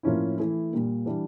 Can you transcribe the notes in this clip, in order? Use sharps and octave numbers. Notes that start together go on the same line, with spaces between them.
A2 F3 A#3 C#4 E4
E3 A3 E4
A#2 G3 A#3
E3 G3 D4